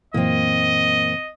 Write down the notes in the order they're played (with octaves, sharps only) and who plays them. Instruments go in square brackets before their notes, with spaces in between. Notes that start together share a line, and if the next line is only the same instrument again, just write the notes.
[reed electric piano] F#2 A#2 E3 [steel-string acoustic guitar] A#3 C4 [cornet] D#5